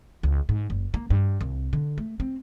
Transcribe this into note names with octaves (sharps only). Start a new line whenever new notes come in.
C#2
G#2
F#1
A#3
G2
C2
D3
A3
C4